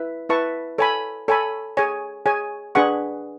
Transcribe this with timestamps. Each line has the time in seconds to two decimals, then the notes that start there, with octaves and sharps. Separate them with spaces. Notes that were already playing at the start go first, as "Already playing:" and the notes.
Already playing: E4 B4 E5
0.29 E4 B4 E5 A5 C#6
0.78 A4 C#5 G#5 B5
1.28 A4 C#5 G#5 B5
1.77 G#4 C#5 G#5
2.26 G#4 C#5 G#5
2.75 D4 G#4 B4 F#5 C#6